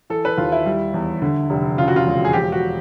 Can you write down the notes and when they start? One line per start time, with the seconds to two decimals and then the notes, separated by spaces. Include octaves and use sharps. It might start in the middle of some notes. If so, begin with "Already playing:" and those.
0.10 E3 A4
0.25 B4
0.38 D#2 F4
0.52 E4
0.66 G3
0.94 E2
1.22 D3
1.50 F1
1.77 C#3 F4
1.88 F#4
1.96 F4
2.06 E1
2.25 G#4
2.33 F3 G4
2.52 F#4